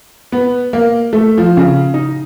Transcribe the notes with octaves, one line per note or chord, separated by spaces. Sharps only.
B3
A#3
A3
F3
C#3
D#4